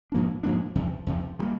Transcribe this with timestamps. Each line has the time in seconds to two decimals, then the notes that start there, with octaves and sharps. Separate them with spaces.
0.12 G#2 F3 A#3 D4
0.43 G#2 F3 A#3 D4
0.75 E2 C3 F3
1.07 E2 C3 F3
1.39 D#3
1.42 G3 A#3